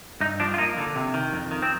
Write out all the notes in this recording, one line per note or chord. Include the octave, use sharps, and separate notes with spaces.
G2 D#4
F3 D4
F4
A#3 D#4
D3
C3
D#3
F2
D#3
C4